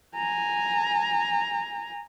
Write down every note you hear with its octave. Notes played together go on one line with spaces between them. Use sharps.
G#5 A#5